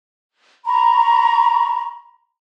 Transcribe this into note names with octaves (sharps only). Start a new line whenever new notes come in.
A#5 B5 C#6